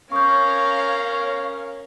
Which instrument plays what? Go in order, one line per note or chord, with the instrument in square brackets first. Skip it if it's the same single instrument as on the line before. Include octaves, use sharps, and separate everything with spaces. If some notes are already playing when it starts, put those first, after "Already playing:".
[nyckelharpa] C#4 A#4 [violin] C#5 F5 [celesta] C#6 D#6 G6